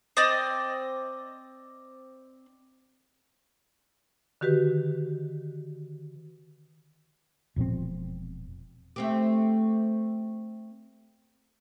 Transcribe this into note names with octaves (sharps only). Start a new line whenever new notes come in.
C4 D5 D#5
D3 D#3 F#4 G4 B4
E1 A#2 F3 C4
A3 C4 G4